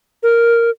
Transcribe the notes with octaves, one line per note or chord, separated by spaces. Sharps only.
A#4